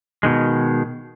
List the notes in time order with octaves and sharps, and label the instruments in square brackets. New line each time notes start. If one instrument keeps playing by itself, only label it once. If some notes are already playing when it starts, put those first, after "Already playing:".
[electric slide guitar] B2 D#3 G#3